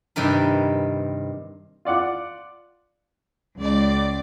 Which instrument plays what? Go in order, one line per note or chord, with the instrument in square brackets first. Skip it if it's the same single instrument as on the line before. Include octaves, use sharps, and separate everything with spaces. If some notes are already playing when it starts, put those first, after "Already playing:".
[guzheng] G2 C3 D#3 G4 A#4 B4
[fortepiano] F4 D5 F#5 D6
[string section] C#2 D5